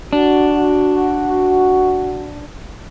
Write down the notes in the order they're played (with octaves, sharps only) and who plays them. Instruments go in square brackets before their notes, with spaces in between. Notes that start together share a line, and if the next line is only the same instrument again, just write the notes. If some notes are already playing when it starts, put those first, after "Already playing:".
[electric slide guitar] D4 [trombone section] F#4